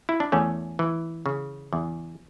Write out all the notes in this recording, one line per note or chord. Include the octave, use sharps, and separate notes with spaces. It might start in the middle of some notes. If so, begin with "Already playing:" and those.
E4
D4
E2 A3 C#4
E3
C#3
E2